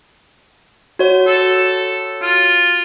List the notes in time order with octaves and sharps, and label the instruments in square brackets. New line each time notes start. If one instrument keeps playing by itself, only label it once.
[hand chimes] F#4 C#5
[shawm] A4
F4